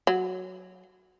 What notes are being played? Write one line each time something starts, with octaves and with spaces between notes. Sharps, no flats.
F#3